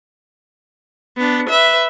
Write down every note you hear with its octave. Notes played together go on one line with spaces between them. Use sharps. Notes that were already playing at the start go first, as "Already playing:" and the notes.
B3 D4
B4 E5